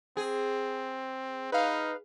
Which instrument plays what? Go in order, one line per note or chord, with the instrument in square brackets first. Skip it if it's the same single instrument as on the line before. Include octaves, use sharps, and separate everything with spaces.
[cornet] C4 [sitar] G#4
[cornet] D#4 [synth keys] B4 F5